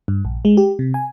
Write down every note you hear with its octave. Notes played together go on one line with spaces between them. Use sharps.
G2
A#1
G#3
G4
C3
G#5